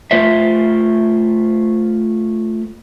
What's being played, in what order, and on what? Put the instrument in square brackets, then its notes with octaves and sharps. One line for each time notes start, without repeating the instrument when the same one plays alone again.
[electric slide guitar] A3 F4 C5 E5